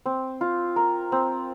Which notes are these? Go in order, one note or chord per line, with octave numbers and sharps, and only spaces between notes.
C4
F4
A#4
C4